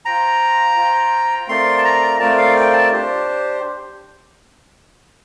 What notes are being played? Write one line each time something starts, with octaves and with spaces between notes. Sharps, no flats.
F4 C5 G5 A#5
F4 C5 G5
A3 C4 F4 A#4 D5 C6
A5
A#5
A3 C4 F4 A#4 D5 A5
F5
G5
A5
D4 G4 C5